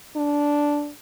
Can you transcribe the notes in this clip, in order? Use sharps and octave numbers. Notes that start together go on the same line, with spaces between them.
D4